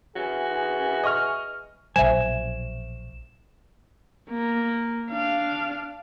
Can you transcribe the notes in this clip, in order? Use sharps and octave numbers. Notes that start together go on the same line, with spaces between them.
E3 F#4 G#4
D#5 C#6 F6
A#1 B2 F#3 C5 E5 G#5 E7
A#3
D4 F5